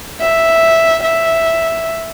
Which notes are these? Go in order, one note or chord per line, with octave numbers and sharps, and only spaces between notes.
E5
E5